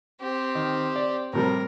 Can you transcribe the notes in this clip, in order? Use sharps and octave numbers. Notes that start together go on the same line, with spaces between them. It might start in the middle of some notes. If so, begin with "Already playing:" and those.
C4 G4
D#3
D5
A2 C3 G3 A#4